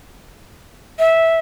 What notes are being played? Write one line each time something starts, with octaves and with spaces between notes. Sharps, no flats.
E5